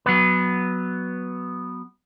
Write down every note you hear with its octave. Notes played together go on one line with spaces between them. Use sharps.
F#3 B3 B4